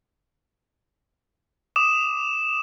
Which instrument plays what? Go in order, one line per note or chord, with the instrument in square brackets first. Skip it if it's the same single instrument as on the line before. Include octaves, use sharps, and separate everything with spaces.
[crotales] D6 D#6 E7